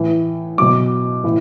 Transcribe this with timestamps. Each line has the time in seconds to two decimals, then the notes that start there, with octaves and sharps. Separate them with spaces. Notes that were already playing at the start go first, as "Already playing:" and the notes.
Already playing: A2 E3
0.58 B2 F#3 D6
1.24 A2 E3